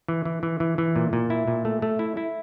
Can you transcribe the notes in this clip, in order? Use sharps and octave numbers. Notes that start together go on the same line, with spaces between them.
E3
E3
E3
E3
E3
A#2
A#2
E4
A#2
A3
A3
E4
E4